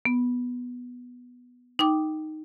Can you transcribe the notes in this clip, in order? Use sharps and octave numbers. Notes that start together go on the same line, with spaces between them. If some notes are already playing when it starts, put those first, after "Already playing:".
B3
D#4 G5 D6